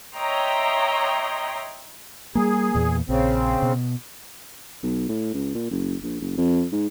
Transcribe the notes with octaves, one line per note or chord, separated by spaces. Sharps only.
C#5 D#5 E5 G5 A#5 C6
G3 A#3 G#4
E2 A#2
A#1 C#3 C4
B2
B1
A2
C#2
A#2
F#1
A#1
F#1
F2
G#2